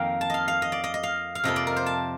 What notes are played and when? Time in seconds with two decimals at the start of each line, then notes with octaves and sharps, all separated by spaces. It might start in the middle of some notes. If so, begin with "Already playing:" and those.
Already playing: F2 D#3 A#3 F5 G5
0.21 A5
0.30 D#5 F5
0.48 F5
0.62 D#5
0.72 D5
0.84 D#5
0.94 D#5
1.03 F5
1.35 F5
1.44 F2 C3 F3 A#3 D#5
1.56 D5
1.67 A#4
1.76 C5
1.86 A5